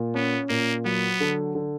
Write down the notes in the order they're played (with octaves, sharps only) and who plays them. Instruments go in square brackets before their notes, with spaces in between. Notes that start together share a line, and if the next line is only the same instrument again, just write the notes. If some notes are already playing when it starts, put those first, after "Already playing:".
Already playing: [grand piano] A#2
[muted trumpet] B3 [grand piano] C#4
[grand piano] A#2 [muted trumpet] A#3
[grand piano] F#3 [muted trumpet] B3
[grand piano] D3
D3